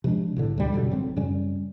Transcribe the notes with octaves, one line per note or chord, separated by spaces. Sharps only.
C3 F3 G#3 D4
B1 A2 D3
A1 D2 B2 G3
F#2 B2 D3 G3
G#1 F#3 C4
F#2 C#3 G3 C#4